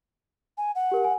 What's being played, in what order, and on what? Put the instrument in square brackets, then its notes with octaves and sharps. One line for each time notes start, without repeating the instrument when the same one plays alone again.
[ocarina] G#5
F#5
[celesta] G4 A#4
G#5